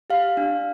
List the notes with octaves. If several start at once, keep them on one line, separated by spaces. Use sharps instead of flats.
G4 F5
D4